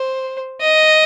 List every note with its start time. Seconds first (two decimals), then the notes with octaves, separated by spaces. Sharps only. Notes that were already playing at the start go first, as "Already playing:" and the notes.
Already playing: C5
0.61 D#5